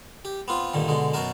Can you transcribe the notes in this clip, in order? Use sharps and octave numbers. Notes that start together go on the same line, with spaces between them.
G4
B3 C4 F4
G2 A#2 D3 D#3
B2 D3 G#3
F#2 B2 F#4 A#4 A5